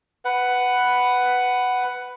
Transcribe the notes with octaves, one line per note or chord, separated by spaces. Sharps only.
B4 F#5